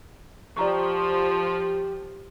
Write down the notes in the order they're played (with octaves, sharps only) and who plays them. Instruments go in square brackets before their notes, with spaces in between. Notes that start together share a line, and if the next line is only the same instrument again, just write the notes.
[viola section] F3 [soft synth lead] G4 [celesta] D5 A#5 C#6